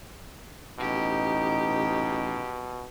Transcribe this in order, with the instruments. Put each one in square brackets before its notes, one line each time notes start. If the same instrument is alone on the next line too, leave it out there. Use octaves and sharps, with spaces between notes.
[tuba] A1 [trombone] B2 [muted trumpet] D#4 [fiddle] G4